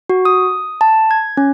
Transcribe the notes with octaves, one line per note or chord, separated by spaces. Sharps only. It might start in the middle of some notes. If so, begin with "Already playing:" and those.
F#4
D#6
A5
G#6
C#4